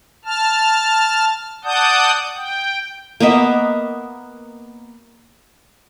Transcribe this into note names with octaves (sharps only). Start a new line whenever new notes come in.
A5 F6
D5 F#5 A5 D#6 G6
G5
A#3 B3 D#5 E5